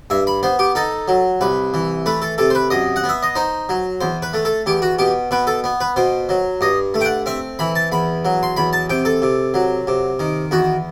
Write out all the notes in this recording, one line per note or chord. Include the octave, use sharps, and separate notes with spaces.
G2 E5
B5
B3 C5
G4
D#4 A4
F#3
C2 B4
E3
A3 B4
A4
C3 A4
C5
B4
F#2 D#5
F#5
B3
E5
D#5
D#4 C5
F#3
E2 C5
B4
A3
A4
E2 G4
F#4
B2 G4
B2 B4
A4
B3
B4
B2 C5
F#3
G2 D#5
A3
G5
F#5
C4 E5
E3 B5
A5
E2 B5
F#3
C6
E2 B5
A5
C3 G5
A4
C3
F#3
C3
D#3
E2 F#4